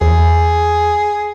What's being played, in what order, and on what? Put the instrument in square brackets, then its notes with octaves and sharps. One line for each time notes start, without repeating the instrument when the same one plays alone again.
[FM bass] E2 [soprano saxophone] G#4